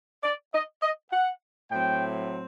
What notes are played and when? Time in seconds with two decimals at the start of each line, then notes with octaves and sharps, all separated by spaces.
0.23 D5
0.54 D#5
0.82 D#5
1.12 F#5
1.70 A2 F#3 C4 G5